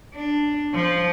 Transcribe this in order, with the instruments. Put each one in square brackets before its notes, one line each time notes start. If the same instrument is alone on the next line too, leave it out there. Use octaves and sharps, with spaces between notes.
[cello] D4
F3